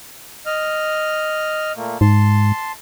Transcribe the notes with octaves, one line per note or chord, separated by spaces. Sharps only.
D#5 F6
A#2 A3 A#3
G#2 A5 C6